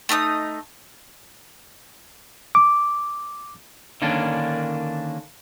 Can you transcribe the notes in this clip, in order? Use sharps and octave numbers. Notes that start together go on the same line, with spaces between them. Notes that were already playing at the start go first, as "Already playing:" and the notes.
A3 D#4 A#5 D#6
D6
D3 D#3 A#3 C#4 D4